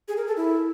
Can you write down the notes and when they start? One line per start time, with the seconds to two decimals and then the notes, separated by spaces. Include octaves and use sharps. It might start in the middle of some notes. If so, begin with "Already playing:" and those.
0.08 G#4
0.17 A#4
0.27 A4
0.37 E4